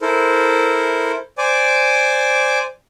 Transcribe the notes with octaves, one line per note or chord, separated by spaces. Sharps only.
E4 A4 A#4 C5
C5 D5 G#5 D6